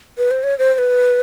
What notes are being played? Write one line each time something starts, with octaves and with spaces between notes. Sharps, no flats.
B4
C5
C#5
C5
C5
B4